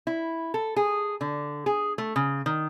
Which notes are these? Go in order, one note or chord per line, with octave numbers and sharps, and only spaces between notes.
E4
A4
G#4
D3
G#4
A3
C#3
D#3